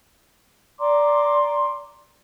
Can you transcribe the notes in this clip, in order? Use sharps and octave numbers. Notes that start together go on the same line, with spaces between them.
D5 A#5 C6 D6